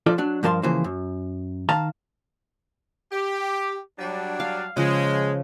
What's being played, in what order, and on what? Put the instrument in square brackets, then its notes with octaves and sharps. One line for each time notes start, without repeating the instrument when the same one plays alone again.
[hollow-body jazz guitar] F3 F4 A4 D5
F#3 D4
G2 F3 A#4 A5 C6
C#3 E3 F3 A#3 C5
F#2
D#3 F5 A5 A#5
[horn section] G4
F#3 G3 D4
[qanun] F5
[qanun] C#3 F3 [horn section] G#3